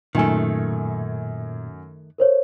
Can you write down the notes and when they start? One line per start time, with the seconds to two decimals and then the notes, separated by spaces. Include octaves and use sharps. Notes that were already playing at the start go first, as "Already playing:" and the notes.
0.15 F#2 A#2 D#3 A3 G#5
2.18 A#4 C5 C#5